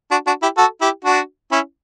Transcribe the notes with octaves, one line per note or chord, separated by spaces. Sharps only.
D4 F#4
D4 F#4
E4 G4
F#4 A4
E4 G4
D4 F#4
C#4 E4